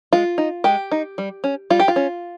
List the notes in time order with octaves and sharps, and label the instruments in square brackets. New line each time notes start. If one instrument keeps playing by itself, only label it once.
[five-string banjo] G#3 F4
D#4
G#3 G4
D#4
G3
C#4
G3 F4
G4
F4
C#4